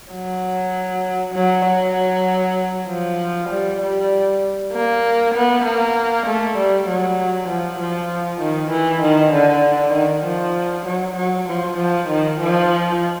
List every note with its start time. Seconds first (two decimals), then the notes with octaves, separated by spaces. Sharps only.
0.12 F#3
1.34 F#3
1.65 F#3
2.88 F3
3.49 G3
3.81 G3
4.72 A#3
5.34 B3
5.64 A#3
6.26 A3
6.57 G3
6.87 F#3
7.48 F3
7.80 F3
8.41 D#3
8.71 E3
9.01 D#3
9.33 D3
9.94 D#3
10.25 F3
10.86 F#3
11.16 F#3
11.48 F3
11.78 F3
12.09 D#3
12.40 F3